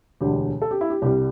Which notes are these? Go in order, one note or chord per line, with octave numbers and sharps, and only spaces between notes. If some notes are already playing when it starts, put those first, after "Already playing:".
E1 D2 D3 G4
A4
G4
E4
G4
C2 C3 G3 G4